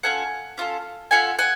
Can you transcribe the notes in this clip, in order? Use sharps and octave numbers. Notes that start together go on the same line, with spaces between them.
C#4 F4 A4 F#5 G#5
C#4 F4 A4
C#4 F4 A4 F#5 G#5
F#5 G#5